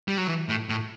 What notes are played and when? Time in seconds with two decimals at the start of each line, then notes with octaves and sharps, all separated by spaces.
0.08 G3
0.18 F#3
0.27 E3
0.49 A2
0.69 A2